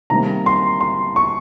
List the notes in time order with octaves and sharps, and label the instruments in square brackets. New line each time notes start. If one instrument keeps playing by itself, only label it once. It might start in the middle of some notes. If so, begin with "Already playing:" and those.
[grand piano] C3 D#3 G3 A#3 A#5
C6
C6
C#6